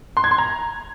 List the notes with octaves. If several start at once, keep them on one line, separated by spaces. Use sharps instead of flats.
C6
G#6
C6
A#5